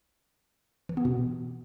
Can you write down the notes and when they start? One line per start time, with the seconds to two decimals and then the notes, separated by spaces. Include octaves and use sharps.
0.89 E3
0.97 B3
1.05 B2